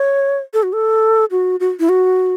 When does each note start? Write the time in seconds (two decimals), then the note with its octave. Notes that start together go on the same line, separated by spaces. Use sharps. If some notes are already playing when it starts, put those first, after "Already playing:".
Already playing: C#5
0.54 A4
0.63 F#4
0.73 A4
1.31 F#4
1.60 F#4
1.80 E4
1.89 F#4